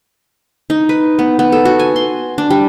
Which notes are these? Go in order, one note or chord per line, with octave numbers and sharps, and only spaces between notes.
D#4
B4
B3
B3
A4
F#4
G#5
C6
D4
G3